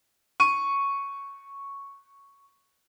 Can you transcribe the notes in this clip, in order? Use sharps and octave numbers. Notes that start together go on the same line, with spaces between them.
C#6 D#7